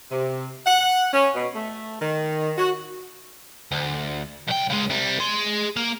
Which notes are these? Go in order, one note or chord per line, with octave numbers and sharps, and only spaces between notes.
C3
F#5
C#4
B2
A3
D#3
F#4
D2
B1 G5
C#3 G#3
C3 G3
G#4 C6
A#3